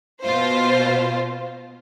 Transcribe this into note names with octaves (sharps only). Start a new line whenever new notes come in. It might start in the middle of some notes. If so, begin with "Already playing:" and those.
B2 F4 C5